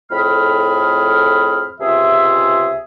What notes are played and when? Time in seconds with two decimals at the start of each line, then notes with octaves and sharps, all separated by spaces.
0.11 F2 A2 G#4 B5 F6
1.81 C#2 C3 F4 G#4 E5